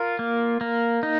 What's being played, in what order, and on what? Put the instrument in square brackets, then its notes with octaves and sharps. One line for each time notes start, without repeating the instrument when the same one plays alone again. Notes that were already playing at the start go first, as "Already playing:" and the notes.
Already playing: [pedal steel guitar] F4 A#4
A#3
A#3
D#4